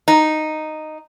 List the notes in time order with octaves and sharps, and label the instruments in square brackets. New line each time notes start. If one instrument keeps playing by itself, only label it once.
[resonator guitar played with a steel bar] D#4